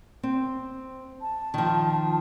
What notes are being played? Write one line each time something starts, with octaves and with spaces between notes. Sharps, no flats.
C4
A5
D#3 F3